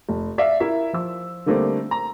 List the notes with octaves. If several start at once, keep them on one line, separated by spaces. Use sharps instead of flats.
F1
D5 E5 F5
E4 A#4 E5
F3 E6
D3 G3 A3 A#3 C4 D4
A#5